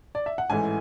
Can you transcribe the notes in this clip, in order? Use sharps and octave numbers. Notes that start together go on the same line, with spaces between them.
D5
E5
F#5
A1 G#2 E3 A3 G#5